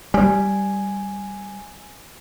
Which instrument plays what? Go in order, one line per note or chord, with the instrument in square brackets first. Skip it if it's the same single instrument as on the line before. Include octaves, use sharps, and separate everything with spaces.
[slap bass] G3 [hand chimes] G#5